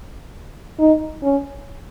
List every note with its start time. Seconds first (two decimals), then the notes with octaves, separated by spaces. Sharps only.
0.79 D#4
1.22 C#4